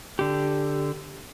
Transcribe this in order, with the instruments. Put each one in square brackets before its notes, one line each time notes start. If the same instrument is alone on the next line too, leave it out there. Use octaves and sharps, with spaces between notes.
[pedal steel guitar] D3 G4